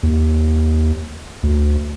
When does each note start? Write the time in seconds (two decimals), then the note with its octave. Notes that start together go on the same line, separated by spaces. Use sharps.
0.03 D#2
1.43 D2